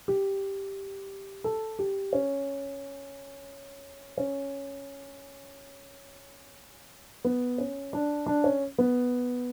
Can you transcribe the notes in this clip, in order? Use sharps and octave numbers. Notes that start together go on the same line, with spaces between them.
G4
A4
G4
C#4
C#4
B3
C#4
D4
D4
C#4
B3